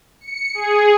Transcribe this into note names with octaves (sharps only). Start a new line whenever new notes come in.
C#7
G#4